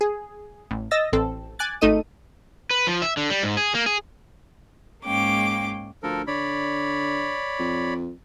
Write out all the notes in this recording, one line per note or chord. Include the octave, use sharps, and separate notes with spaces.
G#4
A1
D#5 E6 A6 A#6
A1 C4 A4
G#5 D6 F#6 A6
G#1 A3 D#4 A4 D#5 D#7
B4
F3
E5
D3
G3
G#2
G#4
A#3
G#4
G#2 G#3 A#3 C#4 G5 D6
D2 F3 A4 A#4
D3 C#5 D5 B5
F2